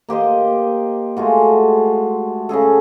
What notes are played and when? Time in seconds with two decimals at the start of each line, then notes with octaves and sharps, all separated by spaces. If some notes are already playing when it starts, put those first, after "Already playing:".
0.09 A#3 G4 C5 D#5
1.17 G#3 A3 F4 F#4
2.49 C#3 F#4 G#4 A4